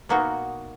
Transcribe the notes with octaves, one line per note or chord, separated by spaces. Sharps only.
B2 A#3 D#4 F#4